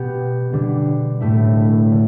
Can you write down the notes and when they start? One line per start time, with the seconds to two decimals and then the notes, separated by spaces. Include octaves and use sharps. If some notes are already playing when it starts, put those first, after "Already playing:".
Already playing: B2 B3 G4
0.53 D3 G3 B3 D4
1.20 A2 A3 E4
1.92 D3